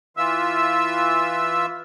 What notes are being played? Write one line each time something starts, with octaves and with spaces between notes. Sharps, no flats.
E3 F4 E5 E6